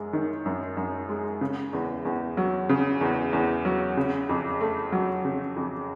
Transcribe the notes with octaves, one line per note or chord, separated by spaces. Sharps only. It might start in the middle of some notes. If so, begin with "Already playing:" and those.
Already playing: F#2 G#3
D#3
F#2
F#2
G#3
C#3
E2
E2
F#3
C#3
E2
E2
F#3
C#3
F2
A3
F#3
C#3
F2